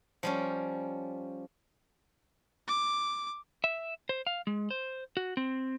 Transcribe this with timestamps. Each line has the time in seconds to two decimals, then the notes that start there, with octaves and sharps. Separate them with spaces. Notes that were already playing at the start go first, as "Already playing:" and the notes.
0.23 F3 G3 C#4
2.68 D6
3.64 E5
4.09 C5
4.27 F5
4.47 G#3
4.71 C5
5.17 F#4
5.37 C4